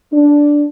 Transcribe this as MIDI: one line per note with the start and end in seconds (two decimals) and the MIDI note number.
0.12 0.65 62